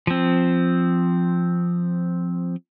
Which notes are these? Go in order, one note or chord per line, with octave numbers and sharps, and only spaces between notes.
F3 C4